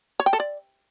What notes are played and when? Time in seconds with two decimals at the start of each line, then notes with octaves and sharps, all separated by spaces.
0.20 C#5
0.26 G5
0.33 A4
0.40 D5